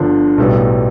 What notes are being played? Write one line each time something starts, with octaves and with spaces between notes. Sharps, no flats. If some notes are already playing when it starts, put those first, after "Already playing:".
Already playing: G1 G2 D3 F3
B1 A2 G3 B3